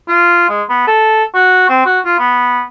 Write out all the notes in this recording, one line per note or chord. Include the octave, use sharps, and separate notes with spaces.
F4
G#3
B3
A4
F#4
C4
F#4
F4
B3